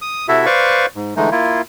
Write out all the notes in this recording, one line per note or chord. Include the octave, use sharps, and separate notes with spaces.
D#6
C3 E4 F#4 A4 E5
B4 C5 D5 F5 C#6
G#2
D3 E3 G#3 A3 D#4
A#3 E4 F4